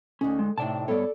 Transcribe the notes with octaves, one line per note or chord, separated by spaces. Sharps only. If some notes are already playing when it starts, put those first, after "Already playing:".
D2 C#4 D#4 G#4
G#3
A2 C3 D#4 D5 A5
G2 B3 A4 C#5 D5